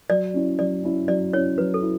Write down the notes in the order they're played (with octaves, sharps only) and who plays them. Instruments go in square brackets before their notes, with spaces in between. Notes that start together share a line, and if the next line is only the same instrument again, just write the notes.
[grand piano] F#3 [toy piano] D5
[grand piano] C#4 E4
[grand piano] F#3 [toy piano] D5
[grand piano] C#4 E4
[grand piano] F#3 [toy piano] D5
[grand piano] C#4 E4 [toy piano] C#5
[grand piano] F#3 [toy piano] B4
[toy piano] A4
[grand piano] E4